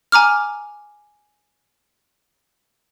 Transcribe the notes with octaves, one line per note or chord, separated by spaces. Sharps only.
G#5 A#5 D6 F6